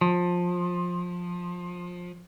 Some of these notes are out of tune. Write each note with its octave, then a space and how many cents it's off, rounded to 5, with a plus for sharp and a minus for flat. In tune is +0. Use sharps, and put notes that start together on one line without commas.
F3 +20